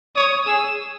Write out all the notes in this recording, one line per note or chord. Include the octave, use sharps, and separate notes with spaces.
C#5 D#6
G#4 E6